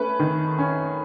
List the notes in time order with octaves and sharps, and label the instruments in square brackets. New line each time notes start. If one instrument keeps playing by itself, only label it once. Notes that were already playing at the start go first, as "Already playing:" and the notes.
Already playing: [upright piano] A3 C#4 B4
D#3
C#4